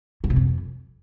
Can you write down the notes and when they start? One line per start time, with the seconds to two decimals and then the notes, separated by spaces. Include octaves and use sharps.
0.24 C#3
0.30 C3
0.36 F2